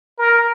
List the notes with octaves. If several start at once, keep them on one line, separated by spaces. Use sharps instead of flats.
A#4